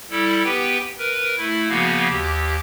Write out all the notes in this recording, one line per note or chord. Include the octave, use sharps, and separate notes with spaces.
G3 E4 A4
B3 G4 B4 G5
A#4 B4
A3 E4
C#3 F3 A#3 B3 F#4 F5
D#2 G4